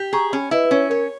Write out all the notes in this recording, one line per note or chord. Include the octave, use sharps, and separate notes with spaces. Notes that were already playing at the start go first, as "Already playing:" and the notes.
Already playing: G4
G#4 A#5 C#6
C#4 G#5 B5
E4 B4 D#5
B4
C#4 C#5
A#4 C#5